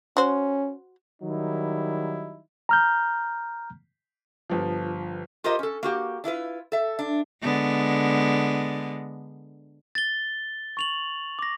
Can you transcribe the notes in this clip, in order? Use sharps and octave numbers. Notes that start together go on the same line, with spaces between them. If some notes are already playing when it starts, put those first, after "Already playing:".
C#4 F#4 C5
D#3 F#3 G3 D#4 E4
A#5 F6 G6
G1 F3
F4 G4 A#4 C5 D#5
C#4 A4
A#3 F#4 G4
D4 E4 F4 B4
A4 E5
D4
D3 G#3 B3
A6 G7
C#6 F7 F#7
D6 A#6